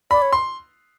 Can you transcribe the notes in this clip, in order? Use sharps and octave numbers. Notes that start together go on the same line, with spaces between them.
D5 B5
C#5
C6